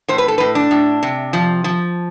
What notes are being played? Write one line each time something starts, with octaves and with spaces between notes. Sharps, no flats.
A2 C5
B4
A4
A2 B4
D4
A2
C3
F3
F3